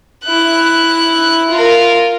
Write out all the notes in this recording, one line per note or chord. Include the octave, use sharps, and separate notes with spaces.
E4 F#6
F4 A#4